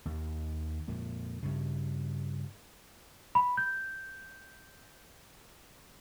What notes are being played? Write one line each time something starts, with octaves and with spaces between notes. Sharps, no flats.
D#2
F2 A#2
G2 C#3
B5
G6